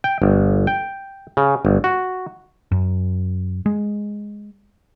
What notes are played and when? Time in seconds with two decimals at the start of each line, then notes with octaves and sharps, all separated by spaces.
0.04 G5
0.22 G1
0.67 G5
1.37 C#3
1.65 G1
1.84 F#4
2.72 F#2
3.66 G#3